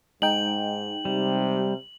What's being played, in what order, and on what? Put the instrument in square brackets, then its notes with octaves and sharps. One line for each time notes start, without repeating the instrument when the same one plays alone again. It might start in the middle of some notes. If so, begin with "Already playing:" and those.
[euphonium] G#2 [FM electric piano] G#3 D#4 G5 [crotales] F#7
[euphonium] C3 [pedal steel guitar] G3